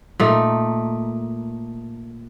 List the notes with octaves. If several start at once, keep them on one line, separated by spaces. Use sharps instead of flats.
A#2 A3 D#4